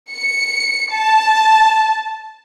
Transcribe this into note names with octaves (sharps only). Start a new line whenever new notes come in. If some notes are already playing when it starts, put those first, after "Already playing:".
C#7
A5